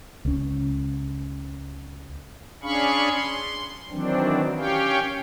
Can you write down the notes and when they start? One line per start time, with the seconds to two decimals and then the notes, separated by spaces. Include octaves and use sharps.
0.25 C#2 C#4
2.63 C#4 D4 G#4 F5 B5 C#6
3.11 C6
3.90 D#3 E3 F#3 C4 D4
4.57 C#4 G4 C#5 F5 G5